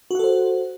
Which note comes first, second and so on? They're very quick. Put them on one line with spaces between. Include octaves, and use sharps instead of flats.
F#4 F#5 A4 C5